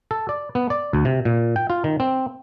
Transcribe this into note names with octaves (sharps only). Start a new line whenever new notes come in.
A4
D5
B3
D5
D2
C3
A#2
G5
F4
D#3
C4